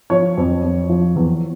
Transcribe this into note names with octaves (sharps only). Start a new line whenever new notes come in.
F3 C#5
F2
F2
F3
E2